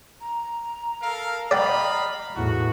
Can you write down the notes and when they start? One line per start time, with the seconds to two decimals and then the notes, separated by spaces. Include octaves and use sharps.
0.21 A#5
1.02 A4 A#4 F5
1.51 D5 D#5 F5 G5 B5
2.36 E2 A2 F#4